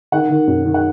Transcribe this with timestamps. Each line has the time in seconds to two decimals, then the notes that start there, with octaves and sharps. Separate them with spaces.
0.12 D#3 F#5
0.29 D#3
0.47 F#2
0.66 D#3
0.74 F#5